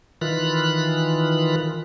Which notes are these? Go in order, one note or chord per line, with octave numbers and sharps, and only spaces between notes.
D#3 E3 F4 B5 F#6